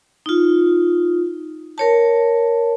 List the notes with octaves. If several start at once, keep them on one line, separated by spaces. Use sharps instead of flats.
D#4 F4
A#4 C#5 A5